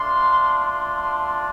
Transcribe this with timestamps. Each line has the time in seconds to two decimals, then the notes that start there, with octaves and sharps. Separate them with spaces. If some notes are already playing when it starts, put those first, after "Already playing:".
Already playing: A3 D4 F4 C6
0.53 C6